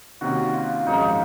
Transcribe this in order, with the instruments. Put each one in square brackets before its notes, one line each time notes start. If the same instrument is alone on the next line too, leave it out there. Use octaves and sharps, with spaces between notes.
[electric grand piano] C3 D#3 A#3 C#4 [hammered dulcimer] F#4
[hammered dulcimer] F4
[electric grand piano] G#1 F#2 F3 G#3 C#4 [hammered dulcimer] D#4